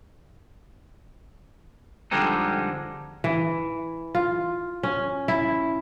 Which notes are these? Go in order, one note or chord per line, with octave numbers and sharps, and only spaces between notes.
F2 D3 G3 G#3 C4 D#4
E3
F4
C#4
E4